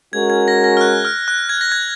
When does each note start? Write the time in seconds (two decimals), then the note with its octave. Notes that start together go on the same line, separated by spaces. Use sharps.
0.13 G#3 C#4 F#4 A#4 G#6
0.30 G#6
0.48 A#6
0.64 A#6
0.77 F6
0.81 F#6
1.05 F6
1.28 F#6
1.49 G#6
1.61 A#6
1.72 G#6